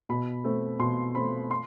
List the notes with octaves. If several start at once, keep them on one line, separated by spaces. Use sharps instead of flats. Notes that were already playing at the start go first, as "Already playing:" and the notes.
B2 B5
A3 C4
B2 C6
A3 C4 B5
C6